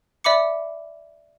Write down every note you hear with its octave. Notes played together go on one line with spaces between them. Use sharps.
D5 E5 B5 D6 C#7